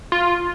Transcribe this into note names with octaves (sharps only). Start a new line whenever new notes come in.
F4